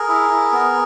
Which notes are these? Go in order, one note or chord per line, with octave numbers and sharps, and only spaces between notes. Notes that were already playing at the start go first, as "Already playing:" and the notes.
Already playing: G#4 A#4
E4
E4
B3